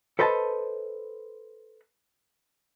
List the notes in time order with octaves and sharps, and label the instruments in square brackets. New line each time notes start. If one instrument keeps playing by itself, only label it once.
[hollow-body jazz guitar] A4 B4 C5 D#5 A5